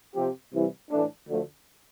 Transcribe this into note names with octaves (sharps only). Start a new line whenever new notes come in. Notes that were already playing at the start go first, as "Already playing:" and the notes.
C3 F3 C4 G4
C2 C3 E3 G3
A2 E3 A3 D4
D2 D3 F3 A3